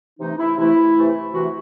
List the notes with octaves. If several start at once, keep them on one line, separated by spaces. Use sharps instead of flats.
C3 E3 A3 D#4
E4
C3 E3 A3 E4
C3 E3 A3
C3 E3 A3 F#4